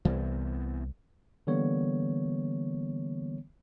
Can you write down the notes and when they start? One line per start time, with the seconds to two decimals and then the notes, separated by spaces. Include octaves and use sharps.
0.05 C2 E3 B3 C4
1.47 D3 E3 G3 A#3 B3 C#5